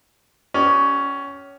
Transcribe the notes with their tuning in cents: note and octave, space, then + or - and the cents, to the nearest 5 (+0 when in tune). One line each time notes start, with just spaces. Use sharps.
C#4 +10 G4 -40 D5 +25